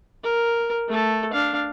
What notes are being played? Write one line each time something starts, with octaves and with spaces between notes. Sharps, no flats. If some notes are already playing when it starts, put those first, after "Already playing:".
A#4
A3 A4
D4 F5